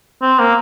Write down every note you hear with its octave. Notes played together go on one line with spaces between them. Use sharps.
C4
A#3